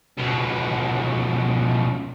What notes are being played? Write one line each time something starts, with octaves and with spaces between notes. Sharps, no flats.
C#2 B2